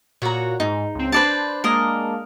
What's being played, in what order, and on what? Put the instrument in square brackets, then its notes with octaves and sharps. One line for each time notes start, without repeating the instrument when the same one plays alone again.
[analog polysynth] A#2 F#4 [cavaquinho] C#5 A#5
[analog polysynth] G#2 [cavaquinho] D#4
[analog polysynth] C#2 C4
[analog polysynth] D4 C5 [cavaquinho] B4 D5 A5
[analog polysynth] G#3 A#3 D4 [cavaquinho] A#4 D#5